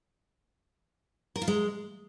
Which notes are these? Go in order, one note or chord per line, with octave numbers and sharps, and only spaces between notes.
A#4
F4
G#3